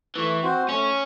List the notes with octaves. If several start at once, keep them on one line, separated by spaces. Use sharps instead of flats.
E3 A3
C4 F#4 C5
A3 C#4